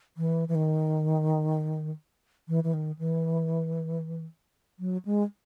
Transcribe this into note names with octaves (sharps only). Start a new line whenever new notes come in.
E3
E3
D#3
E3
E3
D#3
E3
F#3
G#3